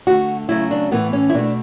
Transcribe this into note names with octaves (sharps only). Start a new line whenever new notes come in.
D3 A3 F#4
C#3 F#3 A3 E4
D4
A2 E3 A3 B3
C#4
E4
B2 A3 D4